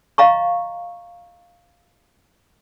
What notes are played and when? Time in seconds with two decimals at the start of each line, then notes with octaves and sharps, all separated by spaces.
0.18 D#5 F5 A#5 C#6